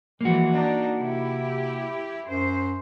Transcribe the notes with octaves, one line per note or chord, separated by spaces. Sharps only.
E3 F3 G#3 A#3 F#4
D4 D#4
C3 E4 G4
F#2 C5